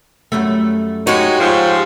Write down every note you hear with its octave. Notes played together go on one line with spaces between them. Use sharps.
F#2 G3 A3
G#3 D#4 F#4 G4 C#5
G#2 F3